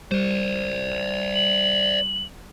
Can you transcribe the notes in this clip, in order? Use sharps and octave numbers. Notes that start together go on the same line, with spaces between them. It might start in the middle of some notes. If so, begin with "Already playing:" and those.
G3 C5 D5
F#7